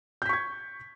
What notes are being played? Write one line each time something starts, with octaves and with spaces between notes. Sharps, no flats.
C#6 G6 G#6 B6